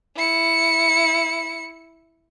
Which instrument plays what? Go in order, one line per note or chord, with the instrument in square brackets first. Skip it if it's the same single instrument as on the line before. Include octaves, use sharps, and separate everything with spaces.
[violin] E4 C#7